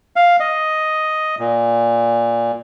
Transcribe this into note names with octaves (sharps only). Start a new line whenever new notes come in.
F5
D#5
A#2